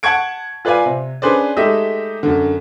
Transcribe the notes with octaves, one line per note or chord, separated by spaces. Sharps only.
F#5 A5 C#6 G#6 D7
F4 B4 D5 F5 G#5
C3
C#4 D4 G#4 B4 C5 D5
G#3 A3 D#4 G4 E5
F#2 D3